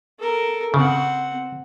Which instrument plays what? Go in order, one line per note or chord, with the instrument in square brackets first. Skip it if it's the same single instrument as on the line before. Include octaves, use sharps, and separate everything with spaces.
[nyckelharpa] A4 A#4
[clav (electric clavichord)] C#3 [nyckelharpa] C4 F#5